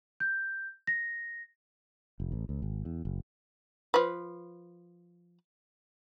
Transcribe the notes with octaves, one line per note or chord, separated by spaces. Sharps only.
G6
A#6
F1
A1
C#2
G#1
E2
F#1
F3 B4